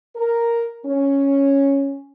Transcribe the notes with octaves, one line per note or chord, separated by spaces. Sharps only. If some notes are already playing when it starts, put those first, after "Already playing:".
A#4
C#4